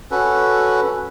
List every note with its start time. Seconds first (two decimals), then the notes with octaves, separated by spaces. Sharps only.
0.11 C#4 F#4 A4 B4